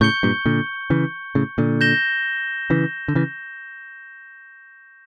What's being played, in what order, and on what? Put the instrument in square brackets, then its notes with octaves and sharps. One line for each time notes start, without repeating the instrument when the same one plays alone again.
[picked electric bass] A2 C#3 [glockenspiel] C#6 G6 C#7 G7
[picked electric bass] G2 A#2
A#2 D3
C#3 E3
A2 C#3
A#2 D3
[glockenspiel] G6 A#6 E7 G7
[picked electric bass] C#3 E3
D3
C#3 E3